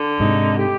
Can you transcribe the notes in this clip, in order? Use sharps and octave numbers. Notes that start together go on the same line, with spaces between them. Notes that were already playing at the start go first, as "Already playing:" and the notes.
Already playing: D3
G#2 C3 D#4
G4